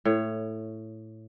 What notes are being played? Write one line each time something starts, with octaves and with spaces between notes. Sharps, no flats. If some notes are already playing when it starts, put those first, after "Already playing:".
A2 C#5